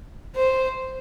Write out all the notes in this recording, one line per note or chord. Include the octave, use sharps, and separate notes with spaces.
C5